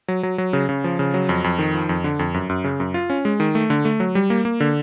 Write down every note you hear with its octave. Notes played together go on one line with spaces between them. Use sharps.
F#3
F#3
F#3
C#3
C#3
F3
C#3
F#3
F2
F2
D#3
F3
F2
D3
F2
F#2
F#2
C#3
F#2
F4
C#4
G#3
D#3
A3
D3
A3
F#3
G3
A#3
A#3
D3